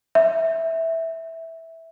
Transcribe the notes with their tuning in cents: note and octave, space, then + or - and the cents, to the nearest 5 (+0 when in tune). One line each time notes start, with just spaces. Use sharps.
E5 -10